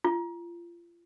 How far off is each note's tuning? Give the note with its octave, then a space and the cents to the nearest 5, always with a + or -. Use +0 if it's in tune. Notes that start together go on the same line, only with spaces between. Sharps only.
F4 -30